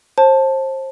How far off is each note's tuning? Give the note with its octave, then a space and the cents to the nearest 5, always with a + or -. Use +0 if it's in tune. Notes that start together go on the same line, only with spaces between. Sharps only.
C5 +30 A5 +0